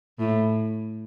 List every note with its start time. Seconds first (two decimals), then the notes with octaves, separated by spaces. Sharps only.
0.19 A2